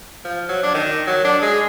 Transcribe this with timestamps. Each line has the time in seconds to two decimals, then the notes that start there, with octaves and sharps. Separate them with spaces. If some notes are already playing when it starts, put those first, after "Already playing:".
0.25 F3
0.49 F#3
0.63 D4
0.74 D#3
1.07 F#3
1.24 D4
1.42 G#3